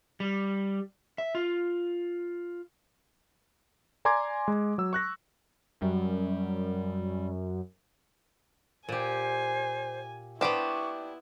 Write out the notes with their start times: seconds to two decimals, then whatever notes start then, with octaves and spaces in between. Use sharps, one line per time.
0.20 G3
1.18 E5
1.35 F4
4.05 D5 G#5 A#5 C6 D6 G#6
4.48 G#3
4.78 F#3 E6
4.93 C#6 F#6 A#6
5.82 F#2 G3
8.89 A#2 G4 C5 G#5
10.41 B3 D4 E4 G4 C5 C#6